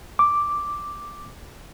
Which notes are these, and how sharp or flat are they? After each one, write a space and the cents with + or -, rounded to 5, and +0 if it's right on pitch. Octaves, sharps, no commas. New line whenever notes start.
D6 +0